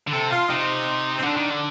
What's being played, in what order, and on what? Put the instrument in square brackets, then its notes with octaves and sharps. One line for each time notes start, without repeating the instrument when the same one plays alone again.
[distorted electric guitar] D3
[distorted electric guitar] C3 [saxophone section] A4
[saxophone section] F4
[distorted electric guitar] C3 [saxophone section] D#4
[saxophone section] C4
[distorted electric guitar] D3 [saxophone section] D4
[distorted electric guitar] D#3
D3